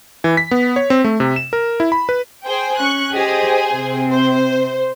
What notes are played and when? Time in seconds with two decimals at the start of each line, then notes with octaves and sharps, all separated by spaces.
0.24 E3
0.37 B6
0.51 B3
0.76 C#5
0.90 C4
1.04 A3
1.20 C3
1.36 E7
1.53 A#4
1.80 E4
1.92 B5
2.09 B4
2.46 G#4 C5 G5
2.78 C#4 C#6 F#6
3.13 G4 G#4 C5 D#5
3.71 C3 C4
4.10 C5